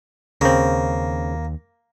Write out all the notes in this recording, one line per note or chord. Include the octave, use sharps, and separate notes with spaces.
D#2 C#3 A#3 C4